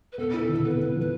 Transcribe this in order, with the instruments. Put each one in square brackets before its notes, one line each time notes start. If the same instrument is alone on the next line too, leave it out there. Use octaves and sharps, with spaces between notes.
[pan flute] B4
[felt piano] B3 [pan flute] A4
[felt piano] E4
[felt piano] D3 [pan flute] A4
[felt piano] B3 [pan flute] B4
[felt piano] B3
[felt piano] F3 [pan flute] B4